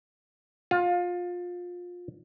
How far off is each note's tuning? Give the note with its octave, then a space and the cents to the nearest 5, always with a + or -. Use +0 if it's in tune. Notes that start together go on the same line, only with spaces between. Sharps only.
F4 +25